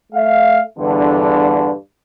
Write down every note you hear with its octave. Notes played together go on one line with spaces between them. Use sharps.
A3 E5 F5
E2 G2 D3